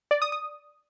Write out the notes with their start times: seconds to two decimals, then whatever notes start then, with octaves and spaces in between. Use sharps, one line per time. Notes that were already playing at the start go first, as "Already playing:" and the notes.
0.11 D5
0.22 D#6
0.32 D#6